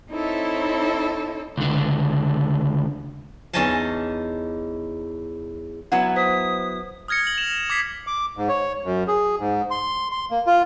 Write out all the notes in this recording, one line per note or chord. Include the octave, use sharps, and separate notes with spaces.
C4 D#4 E4 A4 C#5
C#2 D3
E2 C#4 D#4 D#5 G#5 A5
F#3 B3 E4 F#5
C5 D#6 B6
D#6 F6 G#6 A#6 C#7
F6 F#7
E7 F7
E7
D6 G#6 B6 C7
D6
G#2
C#5
F#2
G#4
G#2
C6
C6
A#3
F4